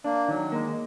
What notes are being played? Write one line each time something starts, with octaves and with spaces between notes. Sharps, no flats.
A#3 D4
D#3 F#3
G#3 A#3